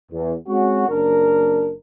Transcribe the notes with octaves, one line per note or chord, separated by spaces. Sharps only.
E2
G#3 C4 C#4 F#4
F#1 D4 A#4